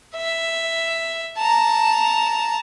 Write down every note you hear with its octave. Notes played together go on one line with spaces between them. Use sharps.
E5
A5 A#5